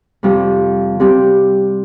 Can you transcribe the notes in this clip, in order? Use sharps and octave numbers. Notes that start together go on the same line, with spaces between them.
F2 C3 G3
C3 G3 C4 G4